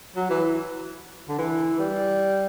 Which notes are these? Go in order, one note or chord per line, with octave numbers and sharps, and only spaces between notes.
F#3
E3
D3
E3
G3